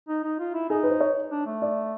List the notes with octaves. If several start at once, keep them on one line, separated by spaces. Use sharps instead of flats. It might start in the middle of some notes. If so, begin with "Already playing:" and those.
D#4
D#4
F4
E4
D#4 G#4
B4
C5
C#5
D4
A3
D5